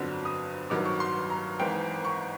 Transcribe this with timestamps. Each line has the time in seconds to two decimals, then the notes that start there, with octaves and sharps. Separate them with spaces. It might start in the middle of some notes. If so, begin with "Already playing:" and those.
Already playing: G1 F2 D3 F#3
0.25 D#6
0.70 A1 G2 D#3 F#3 D6
0.85 C#6
1.00 C6
1.30 A#5
1.60 G#1 G#2 E3 G5
2.05 C#6